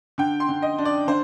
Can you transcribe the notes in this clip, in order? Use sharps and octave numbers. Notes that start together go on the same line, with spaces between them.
D3 G5
C6
D3
D#5
D4
D5
D3 C5